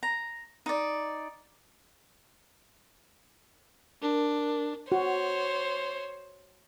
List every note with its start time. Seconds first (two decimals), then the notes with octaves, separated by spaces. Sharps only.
0.03 A#5
0.66 D#4 D5
4.02 D4 A#4
4.92 F#4 C5 C#5